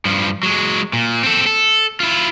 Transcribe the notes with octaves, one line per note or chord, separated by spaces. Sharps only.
G2 F3
F#3 G#3
A#2
C4 A4
A4
E4 F4